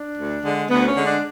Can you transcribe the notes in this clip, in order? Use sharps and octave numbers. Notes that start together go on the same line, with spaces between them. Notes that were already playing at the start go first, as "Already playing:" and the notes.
Already playing: D4
D2
D3 G#3
D2 B3
C#4
D3 G#3
D4